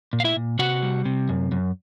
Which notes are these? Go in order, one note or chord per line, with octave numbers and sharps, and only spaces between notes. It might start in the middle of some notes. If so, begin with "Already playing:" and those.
A#2
F5
E4 E5
A#2
C3 F#4 F#5
G3
C3
F#2
F#2